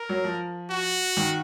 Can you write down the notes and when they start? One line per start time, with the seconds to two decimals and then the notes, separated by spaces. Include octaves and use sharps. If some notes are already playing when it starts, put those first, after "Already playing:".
Already playing: A#4
0.09 F#3
0.24 F3
0.70 F#4
1.17 D#3